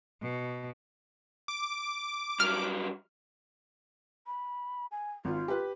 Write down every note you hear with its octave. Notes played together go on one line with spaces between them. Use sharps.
B2
D6
G2 F#3 F6
B5
G#5
G#1 F4
G4 B4